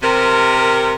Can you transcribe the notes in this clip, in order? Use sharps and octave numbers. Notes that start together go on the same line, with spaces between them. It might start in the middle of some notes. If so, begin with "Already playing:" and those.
C3 A#4